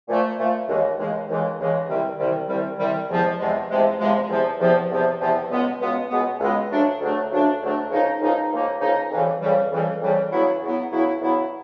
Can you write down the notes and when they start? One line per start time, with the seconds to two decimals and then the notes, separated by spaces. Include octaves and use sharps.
0.08 A#2 F3 A3
0.38 A#2 F3 A3
0.68 D#2 C#3 E3 G#3
0.98 D#2 C#3 E3 G#3
1.29 D#2 C#3 E3 G#3
1.59 D#2 C#3 E3 G#3
1.89 C2 C3 D#3 G3
2.19 C2 C3 D#3 G3
2.49 C2 C3 D#3 G3
2.79 C2 C3 D#3 G3
3.10 E2 C3 F3 G#3
3.39 E2 C3 F3 G#3
3.70 E2 C3 F3 G#3
3.99 E2 C3 F3 G#3
4.29 E2 C3 F3
4.60 E2 C3 F3
4.90 E2 C3 F3
5.20 E2 C3 F3
5.50 C#2 B2 G#3 B3
5.80 C#2 B2 G#3 B3
6.10 C#2 B2 G#3 B3
6.40 C#2 B2 G#3 B3
6.71 D2 C#3 F#3 A3 D4
7.00 D2 C#3 F#3 A3 D4
7.30 D2 C#3 F#3 A3 D4
7.61 D2 C#3 F#3 A3 D4
7.90 C#2 C#3 F3 A#3 D#4
8.21 C#2 C#3 F3 A#3 D#4
8.50 C#2 C#3 F3 A#3 D#4
8.81 C#2 C#3 F3 A#3 D#4
9.11 F2 C#3 E3 G3
9.42 F2 C#3 E3 G3
9.72 F2 C#3 E3 G3
10.01 F2 C#3 E3 G3
10.32 E2 C#3 F#3 B3 E4
10.62 E2 C#3 F#3 B3 E4
10.92 E2 C#3 F#3 B3 E4
11.21 E2 C#3 F#3 B3 E4